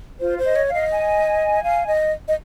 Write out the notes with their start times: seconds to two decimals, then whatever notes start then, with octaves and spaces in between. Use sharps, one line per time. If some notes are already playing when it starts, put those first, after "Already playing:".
0.20 F4 C5
0.38 C5
0.44 D#5
0.56 C#5
0.68 F5
0.74 D#5
0.92 G#5
1.63 F5
1.87 D#5
2.28 D#5